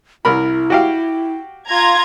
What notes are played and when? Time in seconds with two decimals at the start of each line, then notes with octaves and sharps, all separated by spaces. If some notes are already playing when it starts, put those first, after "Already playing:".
0.25 C2 E4 A#4 B5
0.70 F#4 G4 F5
1.68 F4 A#5 G#6